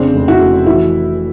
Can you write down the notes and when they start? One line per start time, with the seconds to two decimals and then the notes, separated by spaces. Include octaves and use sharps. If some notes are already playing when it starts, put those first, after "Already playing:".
Already playing: F1 C#3 C4 D4
0.15 F1
0.28 E4 F#4
0.40 F1
0.67 E3 E4 F#4